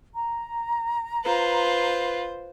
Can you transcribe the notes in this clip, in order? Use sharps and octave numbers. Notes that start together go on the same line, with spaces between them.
A#5
F4 B4 C5